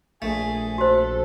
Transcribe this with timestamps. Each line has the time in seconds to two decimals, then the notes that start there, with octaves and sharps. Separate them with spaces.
0.22 A#1 A3 G#4
0.78 F#4 A4 C5